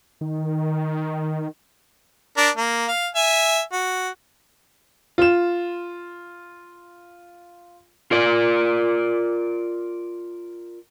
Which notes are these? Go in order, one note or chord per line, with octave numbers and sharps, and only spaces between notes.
D#3
D4 A#4
A#3
F5
E5 G#5
F#4
F4 E7
F4 A#4 D5